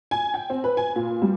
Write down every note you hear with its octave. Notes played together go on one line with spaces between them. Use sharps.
G#5
G5
C4
B4
G#5
A#2
G3